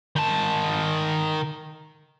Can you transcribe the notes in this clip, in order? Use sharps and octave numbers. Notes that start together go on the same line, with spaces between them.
D#3 A5